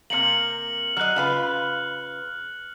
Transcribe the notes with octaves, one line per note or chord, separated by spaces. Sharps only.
C3 A#3 F6 C#7 F#7
F#3 D#5 F6 F#6
C#3 F4 B4